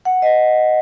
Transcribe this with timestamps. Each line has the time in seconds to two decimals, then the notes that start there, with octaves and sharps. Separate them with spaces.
0.05 F#5
0.22 D#5